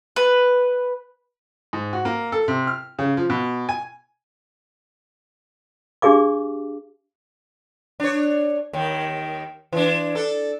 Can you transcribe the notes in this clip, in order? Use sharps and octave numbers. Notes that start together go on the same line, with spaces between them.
B4
G#2
F#4
A#3
A4
C3
F6
C#3
F3
B2
G#5
D4 G4 G#4 F5 D6
D4 C#5
D#2 D#3
E3 D4
D4 A4